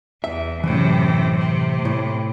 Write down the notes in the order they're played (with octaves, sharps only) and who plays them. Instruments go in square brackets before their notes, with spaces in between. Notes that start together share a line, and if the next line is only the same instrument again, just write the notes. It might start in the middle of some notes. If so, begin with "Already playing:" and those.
[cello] E2 [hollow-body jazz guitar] E5
[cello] F#2 C3 [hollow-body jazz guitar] A2 E3
[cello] C3
[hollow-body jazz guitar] A2